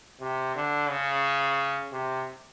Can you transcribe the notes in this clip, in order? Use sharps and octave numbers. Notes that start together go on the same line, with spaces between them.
C3
D3
C#3
C3